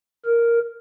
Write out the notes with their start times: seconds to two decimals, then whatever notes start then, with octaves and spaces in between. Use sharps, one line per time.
0.26 A#4